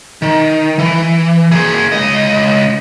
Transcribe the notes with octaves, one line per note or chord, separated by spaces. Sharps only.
D#3
E3
A#3 G#4
C#2 D#5